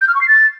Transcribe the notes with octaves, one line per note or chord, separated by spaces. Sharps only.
G6
F6
C#6
C7
A6